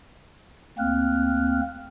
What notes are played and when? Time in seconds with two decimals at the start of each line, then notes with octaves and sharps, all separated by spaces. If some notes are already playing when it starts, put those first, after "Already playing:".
0.78 D2 A#3 C4 F6 F#6